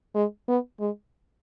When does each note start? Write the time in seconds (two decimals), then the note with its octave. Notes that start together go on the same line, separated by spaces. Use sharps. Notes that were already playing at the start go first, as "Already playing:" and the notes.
0.15 G#3
0.48 B3
0.80 G#3